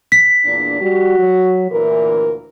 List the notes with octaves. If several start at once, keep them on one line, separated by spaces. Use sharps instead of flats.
B6
E2 A#2 D4
G3 F#4
F#3
D2 A#2 E3 A#4